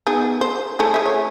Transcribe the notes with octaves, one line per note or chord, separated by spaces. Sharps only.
B3 D#4 G#4
C5
A3 E4 G#4
G#4 E5
C#5